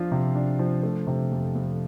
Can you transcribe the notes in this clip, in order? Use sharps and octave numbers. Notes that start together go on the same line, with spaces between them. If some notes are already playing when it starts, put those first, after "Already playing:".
Already playing: F3 D4 F4
C3
D4
F3
A3
C3
F2
F2